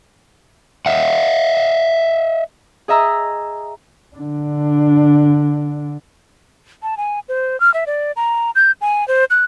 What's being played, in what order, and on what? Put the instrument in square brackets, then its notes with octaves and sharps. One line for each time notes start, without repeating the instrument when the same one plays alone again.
[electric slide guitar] D#5 E5 F#5
[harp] G#4 D#5 E5 A#5 E6
[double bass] D3 D4
[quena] A5
G#5
C5
F6
E5
D5
A#5
G6
G#5
C5
F#6